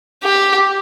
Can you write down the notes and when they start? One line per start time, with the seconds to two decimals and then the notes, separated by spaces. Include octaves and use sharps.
0.24 G4